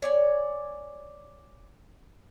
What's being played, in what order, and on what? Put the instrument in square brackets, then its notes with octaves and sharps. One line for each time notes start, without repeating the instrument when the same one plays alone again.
[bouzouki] C#5 D5 G#5